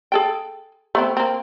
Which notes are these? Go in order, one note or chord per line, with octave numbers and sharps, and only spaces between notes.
G#4 A4 G5
A3 B3 C4
A#3 C4